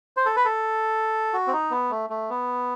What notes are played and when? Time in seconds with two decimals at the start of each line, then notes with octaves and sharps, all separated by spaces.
0.17 C5
0.26 A4
0.36 B4
0.45 A4
1.33 F#4
1.47 C4
1.53 D#4
1.71 B3
1.91 A3
2.10 A3
2.30 B3